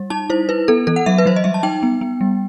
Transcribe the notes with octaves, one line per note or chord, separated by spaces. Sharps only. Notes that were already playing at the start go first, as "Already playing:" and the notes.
Already playing: G3
D#4 A5
E4 C5
E4 B4
B3 A4
E3 A4
F#5
F#3 E5
B4
F#3 C5
D#5
G3 E5
A5
D#4 G5
B3
B3
G3